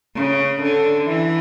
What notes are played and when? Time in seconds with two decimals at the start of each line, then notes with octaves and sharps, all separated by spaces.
0.16 C#3
0.62 D3
1.09 E3